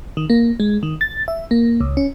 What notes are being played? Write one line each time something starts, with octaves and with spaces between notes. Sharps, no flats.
D#3
A#3
G#3
D#3
A6
E5
A#3
C#2
C#4